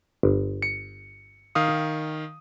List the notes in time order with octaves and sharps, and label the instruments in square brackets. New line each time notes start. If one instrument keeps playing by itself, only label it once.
[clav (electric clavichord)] G1
[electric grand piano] C#7
D#3 F5 D#6